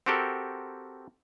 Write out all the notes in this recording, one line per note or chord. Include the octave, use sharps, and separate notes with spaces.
C4 F#4 G4 A4 A#4